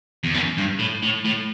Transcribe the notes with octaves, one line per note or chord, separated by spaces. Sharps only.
E2
F#2
G2
A2
A2
A2